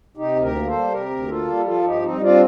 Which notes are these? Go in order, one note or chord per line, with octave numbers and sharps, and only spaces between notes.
C3 D#4 G4
D2
G4 A#4
A#3
A4 C5
G3
C3 G4 A#4
D2
A#3 F4 A4
G3
F3 F4 A4
G2 D#4 G4
G2 C4 D#4
C4 D4 F4